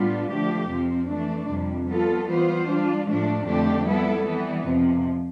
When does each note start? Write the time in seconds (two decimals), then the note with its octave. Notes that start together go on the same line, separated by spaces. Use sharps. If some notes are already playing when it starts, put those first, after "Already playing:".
Already playing: A2 G3 B3 D4 F4
0.30 D3 F3 A3 D4 G4
0.69 F2 C3 F3 C4
1.09 E3 A3 D4
1.49 F2 C3 G3
1.88 G3 B3 F4 A4
2.27 E3 G3 B3 F4 C5
2.67 G3 D4 F4
3.06 A2 F3 A3 D4
3.46 F2 D3 A3 D4 G4
3.86 G3 B3 E4 A4
4.26 E3 G3 B3
4.65 F2 C3 F3